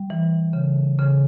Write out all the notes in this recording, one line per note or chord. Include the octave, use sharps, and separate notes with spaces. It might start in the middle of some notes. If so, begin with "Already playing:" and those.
Already playing: G3
E3
C#3
C#3